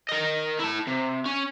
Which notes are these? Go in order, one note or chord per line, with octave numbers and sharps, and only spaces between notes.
A#4 D#5
E4 A5
C3
C#4